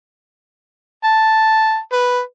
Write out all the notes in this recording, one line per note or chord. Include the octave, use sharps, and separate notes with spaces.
A5
B4